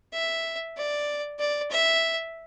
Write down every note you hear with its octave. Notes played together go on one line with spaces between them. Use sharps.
E5
D5
D5
E5